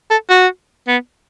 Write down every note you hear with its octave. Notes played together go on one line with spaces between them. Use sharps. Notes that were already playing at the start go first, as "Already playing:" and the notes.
A4
F#4
B3